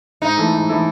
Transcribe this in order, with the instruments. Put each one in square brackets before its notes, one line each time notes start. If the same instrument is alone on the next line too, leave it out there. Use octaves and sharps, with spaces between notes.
[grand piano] G#2 [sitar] D#4
[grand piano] E3 A3 E4 A4
G#2
E3 A3 E4 A4